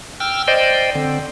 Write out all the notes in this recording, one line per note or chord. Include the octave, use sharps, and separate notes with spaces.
G5 E6 F6
C5 D5 D#5 G5
D3 C4